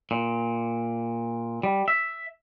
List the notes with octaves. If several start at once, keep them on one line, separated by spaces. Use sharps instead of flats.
A#2
G3
E5